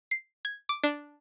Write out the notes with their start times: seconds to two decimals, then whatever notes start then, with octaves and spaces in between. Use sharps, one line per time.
0.11 C7
0.45 G#6
0.69 D6
0.84 D4